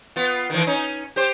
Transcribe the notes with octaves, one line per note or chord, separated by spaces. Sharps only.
B3 F4
D#3 E3
C#4 D#4
G4 C5